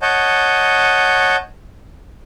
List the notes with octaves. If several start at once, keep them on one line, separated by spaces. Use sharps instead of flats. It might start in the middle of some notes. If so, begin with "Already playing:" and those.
C#5 D#5 F#5 A5 G6